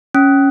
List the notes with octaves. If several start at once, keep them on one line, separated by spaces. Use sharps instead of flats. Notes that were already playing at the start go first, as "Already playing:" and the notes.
C#4